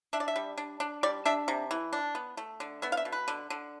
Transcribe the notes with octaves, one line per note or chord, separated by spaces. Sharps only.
D4 E5
D5
E5
G3
D4
D4
G3 D5
D4 E5
C3
E3
D4
B3
A3
D3
B3 E5
F5
E5
B2
B4
D3
D3